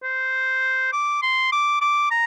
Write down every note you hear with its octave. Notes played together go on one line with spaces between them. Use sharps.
C5
D6
C6
D6
D6
A#5